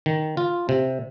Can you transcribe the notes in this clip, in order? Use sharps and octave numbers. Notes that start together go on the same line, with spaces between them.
D#3
F4
C3